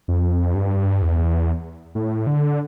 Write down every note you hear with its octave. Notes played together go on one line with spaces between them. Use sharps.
F2
G2
E2
A2
D3